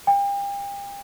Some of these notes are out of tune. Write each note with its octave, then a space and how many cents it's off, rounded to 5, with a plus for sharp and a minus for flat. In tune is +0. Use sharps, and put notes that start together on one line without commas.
G5 +40